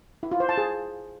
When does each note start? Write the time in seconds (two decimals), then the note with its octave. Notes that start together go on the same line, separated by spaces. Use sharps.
0.23 E4
0.32 F4
0.40 C5
0.49 A5
0.58 G#4